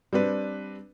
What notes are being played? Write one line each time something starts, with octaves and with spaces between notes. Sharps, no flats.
G3 C4 D4 B4